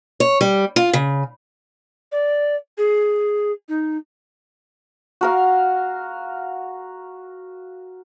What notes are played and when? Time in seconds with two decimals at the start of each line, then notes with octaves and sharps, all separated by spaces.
0.20 C#5
0.41 G3
0.76 F4
0.93 C#3
2.12 D5
2.78 G#4
3.69 D#4
5.21 F#4 A#4 F5